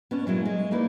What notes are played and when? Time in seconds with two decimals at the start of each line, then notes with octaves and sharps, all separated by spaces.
0.11 B3 C#4 D4
0.26 A#2 F#3 G#3 E4
0.45 G#3
0.71 A#3 D#4 E4 B4 D5